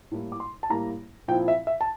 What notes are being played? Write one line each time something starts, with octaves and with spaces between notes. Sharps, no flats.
A2 G3 A#3 E4
D6
C6
A5
A2 G3 A#3 E4 A#5
A#2 F3 C4 E4 G5
E5
E5
A5